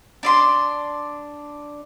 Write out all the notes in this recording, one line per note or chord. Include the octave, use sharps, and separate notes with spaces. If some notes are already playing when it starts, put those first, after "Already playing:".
D4 D5 C6